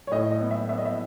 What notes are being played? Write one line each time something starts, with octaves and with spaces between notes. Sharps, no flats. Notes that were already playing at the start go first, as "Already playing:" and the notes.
C#5
A2 D#5
D#5
B3
E5
B3 E5
D#5
E5